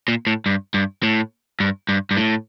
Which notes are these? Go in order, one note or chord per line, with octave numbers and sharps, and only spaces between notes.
A#2
A2
G2
G2
A2
G2
G2
G2
A2